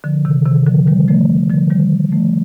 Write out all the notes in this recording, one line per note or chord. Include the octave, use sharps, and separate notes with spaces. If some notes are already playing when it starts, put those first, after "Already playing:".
D3 F3
C3 D#3
C3 D#3
D3 F3
D#3 G3
F3 A3
D3 F3
D#3 G3
F3 A3